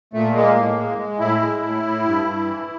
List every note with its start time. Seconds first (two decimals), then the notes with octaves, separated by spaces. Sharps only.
0.13 A#2 A3
0.35 G#3 A#3
0.56 A2
0.77 G#3
0.98 G#3
1.19 A2 E4
1.40 G#3
1.62 A2
1.83 A2
2.04 G2
2.25 G2
2.45 E3